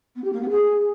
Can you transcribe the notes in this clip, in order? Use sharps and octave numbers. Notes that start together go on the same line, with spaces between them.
B3
G4
A#3
B3
G#4